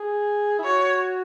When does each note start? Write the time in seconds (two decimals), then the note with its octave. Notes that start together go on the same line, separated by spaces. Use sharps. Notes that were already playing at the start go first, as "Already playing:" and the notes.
Already playing: G#4
0.59 E4
0.64 F#4 C#5